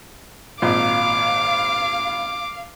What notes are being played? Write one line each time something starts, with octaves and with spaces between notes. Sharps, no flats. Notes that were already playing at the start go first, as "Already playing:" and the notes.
G#1 A#2 F5 D6